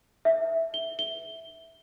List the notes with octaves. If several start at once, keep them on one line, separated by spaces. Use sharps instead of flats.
E5
G7
G7